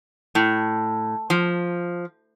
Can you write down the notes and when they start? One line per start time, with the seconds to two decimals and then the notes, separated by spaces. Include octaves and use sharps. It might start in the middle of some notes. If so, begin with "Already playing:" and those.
0.35 A2
1.30 F3